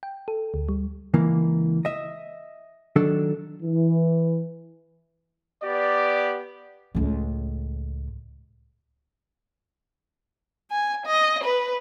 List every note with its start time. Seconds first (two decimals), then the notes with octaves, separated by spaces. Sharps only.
0.03 G5
0.28 A4
0.54 D2
0.69 G3
1.14 C#2 E3 A#3
1.85 D#5 E5
2.96 D#3 F#3 D4 A4
3.63 E3
5.63 B3 G4 D5
6.95 C#2 A2
10.71 G#5
11.06 D#5
11.44 B4